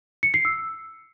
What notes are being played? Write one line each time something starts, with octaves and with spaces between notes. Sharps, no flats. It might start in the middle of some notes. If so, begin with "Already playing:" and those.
C#7
C7
E6